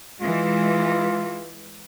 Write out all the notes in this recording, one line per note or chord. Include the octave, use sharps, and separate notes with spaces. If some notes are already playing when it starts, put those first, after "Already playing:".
E3 G#3 F4